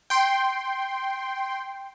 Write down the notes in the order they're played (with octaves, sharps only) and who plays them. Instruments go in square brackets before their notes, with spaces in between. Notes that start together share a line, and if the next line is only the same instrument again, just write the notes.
[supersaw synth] G5 C6